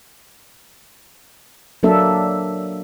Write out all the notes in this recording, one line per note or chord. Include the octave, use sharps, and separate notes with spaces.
F#3 A#3 D4 A4 E5